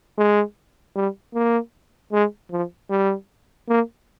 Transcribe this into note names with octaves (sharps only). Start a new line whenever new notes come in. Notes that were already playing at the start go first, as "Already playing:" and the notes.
G#3
G3
A#3
G#3
F3
G3
A#3